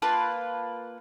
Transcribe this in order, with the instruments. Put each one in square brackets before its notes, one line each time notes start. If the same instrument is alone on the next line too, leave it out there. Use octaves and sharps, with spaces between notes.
[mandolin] A#3 F4 B4 A5